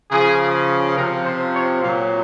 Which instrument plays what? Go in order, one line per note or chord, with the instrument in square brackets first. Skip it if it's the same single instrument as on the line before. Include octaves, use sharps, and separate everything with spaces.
[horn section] C#3 F3 G#4
C3 F3 A#4
C5
C#5
A#2 F#3 F5